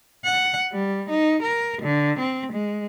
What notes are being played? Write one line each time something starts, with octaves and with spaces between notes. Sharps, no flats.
F#5
G3
D#4
A#4
D3
C4
G#3